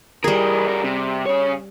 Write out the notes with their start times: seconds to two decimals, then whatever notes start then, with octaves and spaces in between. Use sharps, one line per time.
0.24 E3 G3 G#4 A#4
0.67 G2 A#4
0.84 C3
1.26 C#3 C#5